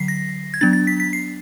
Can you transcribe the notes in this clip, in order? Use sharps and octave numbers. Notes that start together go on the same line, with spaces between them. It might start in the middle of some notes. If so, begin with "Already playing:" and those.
Already playing: D3 F#3 B6 C7
A#6
G#6
F#3 B3 D4 A6
A6
B6
B6
C7